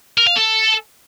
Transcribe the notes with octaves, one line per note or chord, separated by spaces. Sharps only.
A#4
F5
A4